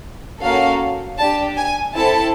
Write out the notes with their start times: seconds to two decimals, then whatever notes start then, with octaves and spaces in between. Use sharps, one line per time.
0.42 A#3 C#4 F#4 A4 F5
1.18 D4 G4 A5
1.57 G#5
1.95 C4 E4 A4 A5